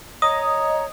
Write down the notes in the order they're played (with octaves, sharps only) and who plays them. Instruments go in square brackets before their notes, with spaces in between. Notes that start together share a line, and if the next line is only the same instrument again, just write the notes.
[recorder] C#5 [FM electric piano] D#5 [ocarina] A#5 [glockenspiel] D#6